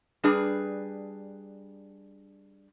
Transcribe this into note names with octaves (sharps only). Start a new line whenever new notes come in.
G3 D4 G#4 B4